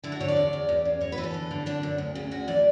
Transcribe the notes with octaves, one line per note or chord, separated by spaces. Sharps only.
D3 E4
F#4
D3 C#5
D5
E2
E2
E2
C#3
E2 C#5
B4
E3
A4
D3
D3
F#2 D4
F#2
D2
C#3
D2 F#4
E3 D5